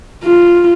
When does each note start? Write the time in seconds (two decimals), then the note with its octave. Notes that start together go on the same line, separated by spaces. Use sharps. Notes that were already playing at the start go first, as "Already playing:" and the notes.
0.23 F4